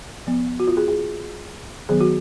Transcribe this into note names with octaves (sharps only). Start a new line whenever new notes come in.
F3 B3
F#4
F4
G#4
G#4
D#3 F#3 B3 G#4
F#4